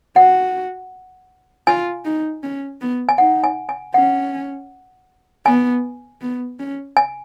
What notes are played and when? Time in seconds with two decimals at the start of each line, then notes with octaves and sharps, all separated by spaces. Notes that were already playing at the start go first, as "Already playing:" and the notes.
0.16 F#4 F#5
1.67 F4 G#5
2.05 D#4
2.43 C#4
2.81 B3
3.09 G#5
3.18 D#4 F#5
3.44 G#5
3.69 G#5
3.94 C#4 F#5
5.46 B3 G#5
6.22 B3
6.59 C#4
6.97 G#5